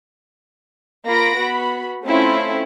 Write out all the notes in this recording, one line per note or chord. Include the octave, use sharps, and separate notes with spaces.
A#3 F4 B5 A#6 D7
B3 F#4 B5
A3 C4 C#4 E4 F4 A4